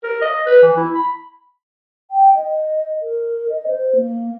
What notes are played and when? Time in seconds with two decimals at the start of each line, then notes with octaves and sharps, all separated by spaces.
0.04 A#4
0.21 D#5
0.46 B4
0.62 E3
0.77 E4
0.95 B5
2.11 G5
2.36 D#5
3.02 A#4
3.50 D#5
3.67 C5
3.96 A#3